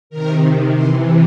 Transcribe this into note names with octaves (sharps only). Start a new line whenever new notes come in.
C3 D#3 A#4
C3 E3 C5